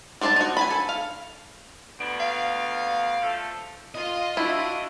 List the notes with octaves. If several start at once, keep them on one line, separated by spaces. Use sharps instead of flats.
G3 D4 C5 E5 A5
D#4 F#4
G#5 A5 B5
A4
F5
D2 B3 D4
F5
F3 A3
F4 D#5
D4 E4 F#4 E5